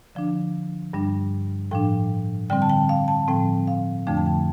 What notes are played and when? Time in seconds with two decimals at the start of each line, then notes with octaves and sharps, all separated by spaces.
0.15 D3 F3 D4
0.93 G2 G3 D4
1.71 A2 F3 D4 G5
2.50 D3 G3 C4 G5
2.62 A5
2.69 G5
2.89 F5
3.08 A5
3.28 A2 F3 C4 G5
3.68 F5
4.07 F2 D3 F3 A3 D4 G5
4.17 A5
4.26 G5